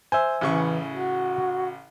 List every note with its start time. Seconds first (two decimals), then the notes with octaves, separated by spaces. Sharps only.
0.12 C5 E5 G#5
0.41 A1 C#3 E3 C#6
0.93 F#4